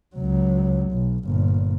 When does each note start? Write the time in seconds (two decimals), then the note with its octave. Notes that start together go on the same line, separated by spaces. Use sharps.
0.15 C#2 F#3
0.92 B1
1.25 G1 A#2